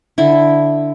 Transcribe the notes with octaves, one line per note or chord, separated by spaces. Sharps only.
D3 E4